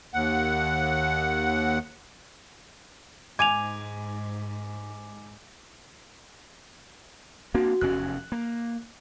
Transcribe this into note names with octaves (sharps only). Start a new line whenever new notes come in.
D#2 F#5
G#2 G#5 D6 G#6 D#7 F7
A#3 C4 D4 F#4
F1 E2 C#4 F#6
A#3